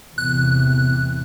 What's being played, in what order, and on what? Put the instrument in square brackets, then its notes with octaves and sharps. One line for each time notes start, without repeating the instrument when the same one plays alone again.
[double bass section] E2 A2 C3 [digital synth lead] F#6